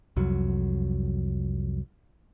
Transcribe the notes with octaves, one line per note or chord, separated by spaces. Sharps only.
C2 F2 F#3